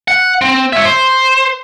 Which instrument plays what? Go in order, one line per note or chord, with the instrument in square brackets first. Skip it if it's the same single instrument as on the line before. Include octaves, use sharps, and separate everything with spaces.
[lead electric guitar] F#5
C4
C#5 E5
C5